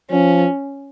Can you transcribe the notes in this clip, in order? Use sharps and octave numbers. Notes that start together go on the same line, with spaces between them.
F3 C#4